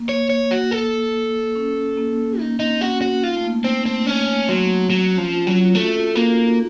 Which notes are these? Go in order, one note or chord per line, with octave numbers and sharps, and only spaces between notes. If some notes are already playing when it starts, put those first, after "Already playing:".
Already playing: A#3
C#5
A#3
C#5
A#3
F#4
A4
C#4
A#3
A#3 D#4
C4 D#4
C#4 F#4
C#4 F#4
D#4 F4
A3
A#3
A#3 C4
A3 C4
C#4
F#3 C4
F#3 C4
C#4
F3
F4
F#3
F4
A3 F#4
A4
A#3 F#4
D#4